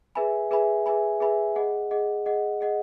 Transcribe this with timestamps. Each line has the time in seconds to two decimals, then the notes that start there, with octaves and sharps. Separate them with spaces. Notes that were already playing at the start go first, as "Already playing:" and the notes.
0.15 G#4 B4 E5 G#5 B5
0.51 G#4 B4 E5 G#5 B5
0.86 G#4 B4 E5 G#5 B5
1.20 G#4 B4 E5 G#5 B5
1.56 G#4 D#5 F#5
1.91 G#4 D#5 F#5
2.26 G#4 D#5 F#5
2.61 G#4 D#5 F#5